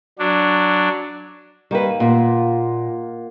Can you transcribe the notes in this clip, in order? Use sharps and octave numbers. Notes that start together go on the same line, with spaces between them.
F#3 D4
D#3 G3 A#3 B4
A#2 A#3 F4 F#5